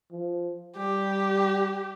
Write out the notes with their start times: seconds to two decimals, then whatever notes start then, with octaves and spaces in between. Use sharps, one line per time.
0.11 F3
0.77 G3 G4